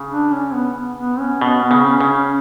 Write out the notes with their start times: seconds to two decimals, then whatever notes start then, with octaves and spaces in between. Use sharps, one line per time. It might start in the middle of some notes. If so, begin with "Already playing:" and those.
Already playing: C#3
0.10 D4
0.32 C#4
0.53 B3
0.97 B3
1.19 C#4
1.41 B2 B3
1.64 B3
1.71 C#3
1.86 C#4
2.00 C#3
2.08 C#4